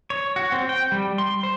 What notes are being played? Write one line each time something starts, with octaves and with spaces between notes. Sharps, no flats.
C#5
F#4
C4
G5
G3
C6
C5